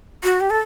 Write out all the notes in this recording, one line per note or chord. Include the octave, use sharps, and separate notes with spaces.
F#4
G4
A4